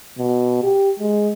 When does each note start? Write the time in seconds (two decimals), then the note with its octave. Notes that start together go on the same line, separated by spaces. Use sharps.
0.19 B2
0.63 G4
1.00 G#3